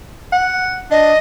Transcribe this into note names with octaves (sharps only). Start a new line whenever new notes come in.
F#5
D4 D#5